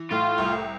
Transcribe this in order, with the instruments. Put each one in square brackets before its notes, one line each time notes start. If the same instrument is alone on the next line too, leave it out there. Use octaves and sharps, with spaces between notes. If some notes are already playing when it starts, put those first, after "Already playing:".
Already playing: [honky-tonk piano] E3
[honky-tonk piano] A2 [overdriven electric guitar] F4
[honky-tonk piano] C2